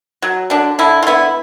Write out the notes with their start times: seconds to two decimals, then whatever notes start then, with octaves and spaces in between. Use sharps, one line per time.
0.22 F#3
0.50 D3 D4
0.79 D3 E4
1.03 F4
1.07 B3 E4